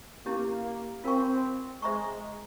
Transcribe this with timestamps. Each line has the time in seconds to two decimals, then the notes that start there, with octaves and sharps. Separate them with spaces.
0.26 A#3 C#4 E4 G4
1.04 C4 F4 A#4 F5 G#5 C#6
1.82 G#3 C5 E5 A#5 C#6